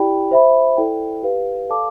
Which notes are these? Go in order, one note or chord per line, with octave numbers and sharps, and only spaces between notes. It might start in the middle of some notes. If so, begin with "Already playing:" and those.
Already playing: E4 G4 D5 G5 B5
C5 E5 B5
E4 A4 D5 G5
G4 B4 F5
A4 D5 F5 A5 D6